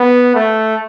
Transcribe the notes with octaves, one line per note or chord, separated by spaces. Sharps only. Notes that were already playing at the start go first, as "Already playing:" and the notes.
Already playing: B3
A3